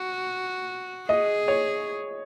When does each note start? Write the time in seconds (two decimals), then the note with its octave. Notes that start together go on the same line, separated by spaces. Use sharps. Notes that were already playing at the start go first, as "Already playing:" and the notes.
Already playing: F#4
1.09 G#4 D#5
1.48 C#5